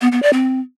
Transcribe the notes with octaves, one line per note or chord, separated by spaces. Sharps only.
B3
B3
D5
C4